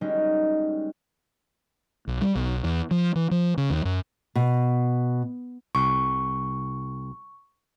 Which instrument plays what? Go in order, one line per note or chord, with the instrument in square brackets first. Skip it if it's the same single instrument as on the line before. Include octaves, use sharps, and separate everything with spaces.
[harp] G3 G#3 A#3 C#4 D#4 F#4
[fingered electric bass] B1
G3
B1
E2
F3
E3
F3
C#3
D#2
F#2
[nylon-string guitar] B2
[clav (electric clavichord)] C2 [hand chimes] C#6